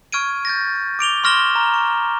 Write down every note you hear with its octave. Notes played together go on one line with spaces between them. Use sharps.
C#6 F6 G#6 D7 D#7
G6 A6 A#6
D6 D7 F7 G7
C6 C#6 F6 A#6 E7 G7
A#5
C#6